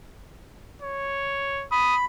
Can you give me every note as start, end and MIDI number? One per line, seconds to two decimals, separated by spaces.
0.81 1.66 73
1.71 2.05 83
1.71 1.95 87